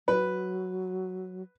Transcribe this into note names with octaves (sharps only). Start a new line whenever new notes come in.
F#3 B4